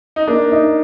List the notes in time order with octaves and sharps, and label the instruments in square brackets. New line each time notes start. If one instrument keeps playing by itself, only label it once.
[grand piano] D#4
[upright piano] A#3 [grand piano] D4
[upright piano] D#4